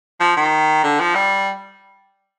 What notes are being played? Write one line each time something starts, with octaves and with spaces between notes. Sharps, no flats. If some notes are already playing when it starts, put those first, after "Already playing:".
F3
D#3
D3
F3
G3